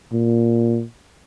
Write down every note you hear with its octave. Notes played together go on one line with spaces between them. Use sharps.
A#2